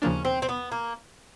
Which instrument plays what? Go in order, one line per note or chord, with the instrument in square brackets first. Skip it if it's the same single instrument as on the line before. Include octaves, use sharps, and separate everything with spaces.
[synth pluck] D#2 C#3 F3 A#3 D4 [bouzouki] C#4
[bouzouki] C4
C4
B3
A#3